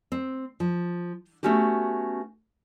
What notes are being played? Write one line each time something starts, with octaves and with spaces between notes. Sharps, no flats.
C4
F3
A3 B3 C#4 F#4 G4